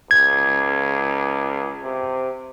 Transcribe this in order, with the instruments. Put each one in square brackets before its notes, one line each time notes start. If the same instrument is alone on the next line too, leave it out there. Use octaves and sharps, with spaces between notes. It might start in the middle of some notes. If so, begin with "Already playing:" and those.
[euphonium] C#2 [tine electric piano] G#6
[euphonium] C3